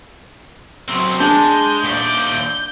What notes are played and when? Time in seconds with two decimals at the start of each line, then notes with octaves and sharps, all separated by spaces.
0.88 F#3 C4
1.20 G#3 D4 G6
1.84 D#2 D5